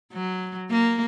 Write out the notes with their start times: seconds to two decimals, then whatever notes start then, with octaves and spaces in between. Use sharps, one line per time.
0.13 F#3
0.71 A#3